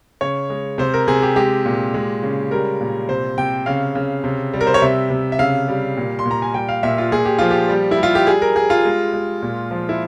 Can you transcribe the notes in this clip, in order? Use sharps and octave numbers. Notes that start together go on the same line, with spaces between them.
C#3 C#5
G#3
C3 C5
A#4
C3 G#4
G4
G#3 G4
A#2
G#3
C#3
G3 A#4
A#2
C3 C5
C3 G5
C#3 F5
C#3
C3
G3
A#4
C5
C#5
C3 E5
C3
E5
C#3 F5
G3
A#2
C6
A#2
A#5
G#5
G3 G5
F5
A#2 E5
F4
A#2 G#4
G4
F3 F4
G4
G3
E4
G3 F4
G4
G3 G#4
A#4
G3 G#4
F4
G#3
G#3
A#2
F3
E4